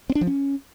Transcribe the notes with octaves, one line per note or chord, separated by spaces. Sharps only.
C4
D4
F3
C#4